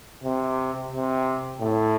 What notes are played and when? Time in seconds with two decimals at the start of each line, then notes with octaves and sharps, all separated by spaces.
0.24 C3
0.91 C3
1.61 A2